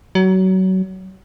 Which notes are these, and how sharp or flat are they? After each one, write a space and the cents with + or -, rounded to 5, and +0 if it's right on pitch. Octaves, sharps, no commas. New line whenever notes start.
F#3 +25